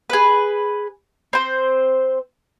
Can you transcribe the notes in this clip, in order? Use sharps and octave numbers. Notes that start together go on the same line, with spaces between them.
G#4 B4
C4 C5